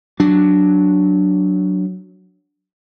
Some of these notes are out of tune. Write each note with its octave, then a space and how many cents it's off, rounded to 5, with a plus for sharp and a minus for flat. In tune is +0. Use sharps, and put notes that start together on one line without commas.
F#3 +0 D4 +0